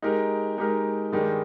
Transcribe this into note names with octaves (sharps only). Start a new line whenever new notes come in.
G#3 D#4 G4 A#4
G#3 D#4 G4 A#4
G2 D#3 G#3 D#4 G4